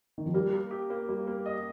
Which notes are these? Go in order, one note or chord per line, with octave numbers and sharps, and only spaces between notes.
D#3
F3
G3 A#3
A#3
G4
A#3
G3 A#3
A#3
D#5